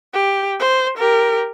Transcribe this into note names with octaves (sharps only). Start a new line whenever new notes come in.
G4
C5
G4 A#4